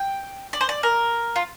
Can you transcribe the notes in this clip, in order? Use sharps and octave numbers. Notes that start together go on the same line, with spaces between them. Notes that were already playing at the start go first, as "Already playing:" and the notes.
Already playing: G5
D5
C5
D5
A#4
F4